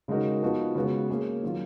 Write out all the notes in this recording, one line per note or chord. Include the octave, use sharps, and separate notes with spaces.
C#3 G#3 D#4 F#4 A#4
F3 B3 D#4 F#4
C#3 G#3 B3 F#4 B4
A#3 C#4 G#4
D#3 F#3 C#4 F4